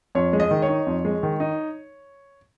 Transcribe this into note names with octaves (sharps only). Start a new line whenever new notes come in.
F2 C#5
G#3
D#5
D#3
C#5
D#4
F2
G#3
D#3
D#4